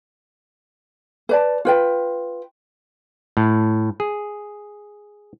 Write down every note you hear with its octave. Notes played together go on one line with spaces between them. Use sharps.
B4 D5 A5
F4 B4 G5
A2
G#4